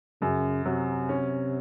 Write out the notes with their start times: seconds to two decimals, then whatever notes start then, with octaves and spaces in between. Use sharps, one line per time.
0.22 F#2 C#3
0.65 C3 F#3
1.09 C#4